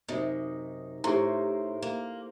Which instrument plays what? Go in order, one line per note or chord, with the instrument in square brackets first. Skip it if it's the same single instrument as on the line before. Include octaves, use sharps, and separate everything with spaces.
[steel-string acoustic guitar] F#2 C3 [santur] D#4
[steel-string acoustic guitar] A2 [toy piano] E4 G4 [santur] A#4 C5
[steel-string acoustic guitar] A#3